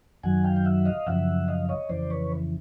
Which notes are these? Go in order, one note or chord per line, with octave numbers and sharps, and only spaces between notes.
F#2 D#3 F#3 F#5 G#5
F5 G5
G5
E5 F#5
D#5 F5
F#2 C#3 F3 E5 F#5
D#5 F5
C#5 D#5
F2 C#3 E3 C5 D5
B4 C#5